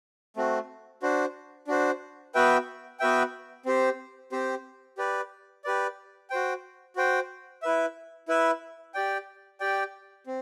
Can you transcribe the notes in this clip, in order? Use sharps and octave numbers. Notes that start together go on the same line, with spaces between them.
A3 C4 F#4
D4 F#4 C5
D4 F#4 C5
B3 F#4 B4 E5 G5
B3 F#4 B4 E5 G5
C4 G4 C5
C4 G4 C5
G4 B4 D5
G4 B4 D5
F#4 C5 G5
F#4 C5 G5
E4 B4 E5
E4 B4 E5
G4 D5 G5
G4 D5 G5
C4